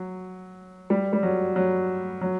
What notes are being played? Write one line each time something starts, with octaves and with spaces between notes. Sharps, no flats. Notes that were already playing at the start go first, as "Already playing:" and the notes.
Already playing: F#3
G3
G3
F#3
F#3
F#3